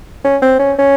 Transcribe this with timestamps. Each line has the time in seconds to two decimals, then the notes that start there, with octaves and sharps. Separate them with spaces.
0.25 C#4
0.42 C4
0.60 C#4
0.79 C#4